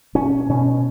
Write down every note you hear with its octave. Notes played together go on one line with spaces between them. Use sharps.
B2 C#4
B2 C#4